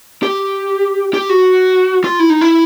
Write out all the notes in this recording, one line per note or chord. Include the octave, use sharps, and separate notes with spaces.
G4
G4
F#4
F4
E4
D#4
E4